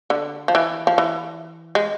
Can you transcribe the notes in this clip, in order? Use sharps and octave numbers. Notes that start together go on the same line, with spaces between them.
D3
F3
E3
F3
E3
G#3